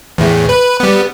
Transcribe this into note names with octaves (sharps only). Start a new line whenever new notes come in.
E2 A2
B4
G3 B3